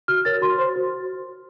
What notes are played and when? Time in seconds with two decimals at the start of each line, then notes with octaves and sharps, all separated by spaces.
0.08 F#4 F6
0.25 A#4 C#5 A6
0.42 F#4 C6
0.59 C5
0.76 F#4